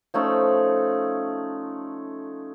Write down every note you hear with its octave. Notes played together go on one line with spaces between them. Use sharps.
F3 A3 C#4 D#4